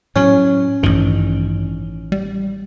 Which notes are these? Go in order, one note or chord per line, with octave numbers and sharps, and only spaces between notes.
A2 F#3 C#4
A1 G2 D#3
G3